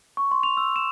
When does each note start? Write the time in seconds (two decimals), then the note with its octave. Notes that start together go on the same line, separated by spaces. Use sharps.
0.17 C#6
0.32 C6
0.43 F7
0.57 E6
0.76 E7